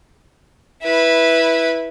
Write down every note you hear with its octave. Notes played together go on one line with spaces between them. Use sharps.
E4 B4